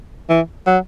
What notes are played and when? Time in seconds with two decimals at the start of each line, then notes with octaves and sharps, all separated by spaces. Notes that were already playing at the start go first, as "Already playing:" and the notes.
0.30 E3
0.67 F#3